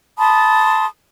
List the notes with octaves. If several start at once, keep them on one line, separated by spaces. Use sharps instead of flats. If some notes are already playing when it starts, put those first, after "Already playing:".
A5 B5 C6 D#6